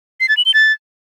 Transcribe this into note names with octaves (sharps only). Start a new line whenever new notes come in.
C7
A6
F#7
G7
A6